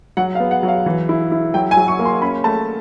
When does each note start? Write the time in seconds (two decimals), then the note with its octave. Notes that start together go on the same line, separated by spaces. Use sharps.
0.17 F#3 F#5
0.35 F5
0.40 B3
0.51 F#5
0.63 F#3
0.68 F5
0.86 E3
1.09 E4
1.32 E4
1.54 F#3 G5
1.71 G#5
1.77 F#3
1.88 C#6
1.99 A#3
2.05 C6
2.22 C#4 B5
2.44 A3 A5